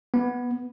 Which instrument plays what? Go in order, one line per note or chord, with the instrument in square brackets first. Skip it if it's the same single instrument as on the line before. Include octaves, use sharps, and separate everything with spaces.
[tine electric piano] B3